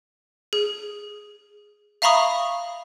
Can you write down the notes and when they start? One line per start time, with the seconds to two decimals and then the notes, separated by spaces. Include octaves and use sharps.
0.53 G#4
2.02 E5 F5 A#5 B5 C#6 D#6